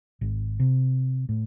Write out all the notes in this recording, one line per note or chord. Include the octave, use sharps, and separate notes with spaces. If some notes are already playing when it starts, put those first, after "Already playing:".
G#1
C3
A2